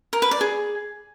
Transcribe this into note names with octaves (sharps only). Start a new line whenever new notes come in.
A#4
B4
D5
G#4